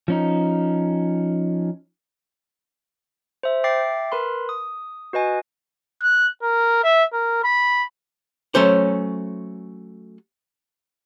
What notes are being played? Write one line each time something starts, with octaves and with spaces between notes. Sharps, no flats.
F3 C#4 D#4
C5 E5
E5 G5 D6 A6 C7
A#4 B4 B5 C6
D#6
F#4 B4 D#5 G#5
F#6
A#4
E5
A#4
B5
F#3 A3 C#4 C5